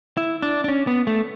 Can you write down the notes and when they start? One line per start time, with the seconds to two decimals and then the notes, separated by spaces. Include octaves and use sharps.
0.17 E4
0.42 D4
0.64 D4
0.68 C#4
0.87 B3
1.07 A3